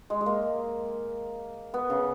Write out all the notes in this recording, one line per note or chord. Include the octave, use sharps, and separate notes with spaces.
G#3
G#3
A#3
B3
C#3